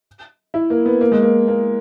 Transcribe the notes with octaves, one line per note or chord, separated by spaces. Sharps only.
E4
A#3
B3
A#3
G#3
A#3
A#3